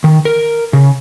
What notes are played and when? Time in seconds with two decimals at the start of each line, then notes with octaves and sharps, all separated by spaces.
0.04 D#3
0.25 A#4
0.73 C#3